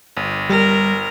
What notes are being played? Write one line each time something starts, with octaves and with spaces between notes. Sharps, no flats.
G1
G3 A#4